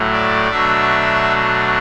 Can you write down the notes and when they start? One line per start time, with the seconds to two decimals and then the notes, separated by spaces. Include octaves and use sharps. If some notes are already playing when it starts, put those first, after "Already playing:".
Already playing: A2 F#3 A3
0.12 D5
0.51 B2 F#3 A3 D4 E5